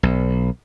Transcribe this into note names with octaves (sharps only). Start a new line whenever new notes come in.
B1